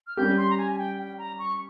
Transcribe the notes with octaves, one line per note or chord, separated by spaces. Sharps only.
F6
G3 C#4 G4 G6
C6
A#5
G#5
G#5
G5
G5
A#5
C#6